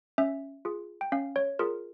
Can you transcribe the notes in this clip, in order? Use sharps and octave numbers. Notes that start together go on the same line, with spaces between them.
C#4 E5
F4 G#4
G5
C#4 F5
C#5
F4 G#4 A#4